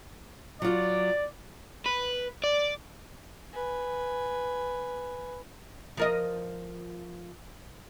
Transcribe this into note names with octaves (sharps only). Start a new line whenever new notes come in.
F#3 F4 D5
B4
D5
B4 G#5
F3 A#4 D#5